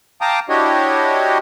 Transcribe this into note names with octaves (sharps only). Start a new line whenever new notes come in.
F5 G5 A5 A#5 D6 D#6
D4 E4 F#4 G4 C#5 D#5